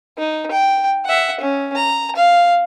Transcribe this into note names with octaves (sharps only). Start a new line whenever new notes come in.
D#4
G5
E5 F#5
C#4
A#5
F5